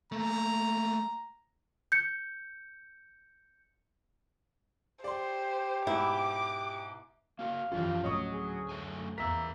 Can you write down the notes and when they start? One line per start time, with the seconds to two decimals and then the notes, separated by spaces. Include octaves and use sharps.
0.12 A3 A#3 A#5
1.92 G6 C#7
5.04 G4 C5 D5 C6
5.87 G#2 B2 E4 D6
7.39 A#3 F#4 A#4 F5
7.72 F#2 E3 F3 C#4 D4 F4 G4
8.04 D2 A2 F#3 C#4 D#5 C#6 D#6
8.32 G#4
8.69 F#2 A3 G#5
9.18 E2 A#3 A#4 E5 E6 B6